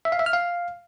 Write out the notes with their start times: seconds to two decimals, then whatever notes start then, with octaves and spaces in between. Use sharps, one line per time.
0.05 E5
0.12 F5
0.19 E5
0.26 F6
0.33 F5